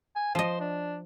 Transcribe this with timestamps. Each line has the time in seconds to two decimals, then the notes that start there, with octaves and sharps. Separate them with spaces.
0.16 G#5
0.35 F3 C5 D#5
0.61 D4